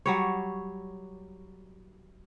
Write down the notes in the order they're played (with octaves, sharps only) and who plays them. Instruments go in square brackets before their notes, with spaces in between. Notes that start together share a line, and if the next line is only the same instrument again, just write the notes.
[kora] F#3 G3 C#5